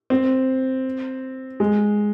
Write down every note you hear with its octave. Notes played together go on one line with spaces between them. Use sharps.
C4
G#3